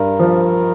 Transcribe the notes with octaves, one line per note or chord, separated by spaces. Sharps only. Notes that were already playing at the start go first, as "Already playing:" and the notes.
Already playing: G2 A#4
F3